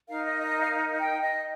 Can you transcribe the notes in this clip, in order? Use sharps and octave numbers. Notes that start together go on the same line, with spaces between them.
D#4 A#4 F5
D#5
D#5
F5
G5
D#5